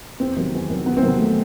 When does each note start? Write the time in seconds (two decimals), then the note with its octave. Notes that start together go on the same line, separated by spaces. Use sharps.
0.20 E2 C4
0.36 C3 D#3 F#3
0.54 E2
0.69 C3 D#3 F#3
0.86 E2 B3
0.97 C4
1.02 C3 D#3 F#3
1.08 B3
1.19 A3